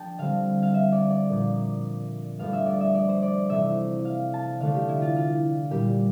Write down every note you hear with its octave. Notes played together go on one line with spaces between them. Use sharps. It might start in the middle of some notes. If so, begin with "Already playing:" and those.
Already playing: F3 A3 D4 G5 A5
D3 G3 C4 F5
F5
E5
D5
D5
A#2 F3 A#3 D4
G2 F3 A3 D4 F5
E5
D5
E5
D5
C5
D5
C3 E3 A3 E5
F5
A5
D3 A3 D4 F5
G4
E4
F4
F4
A#2 G3 D4 G4